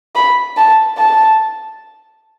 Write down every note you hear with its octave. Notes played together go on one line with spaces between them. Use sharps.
B5
A5
A5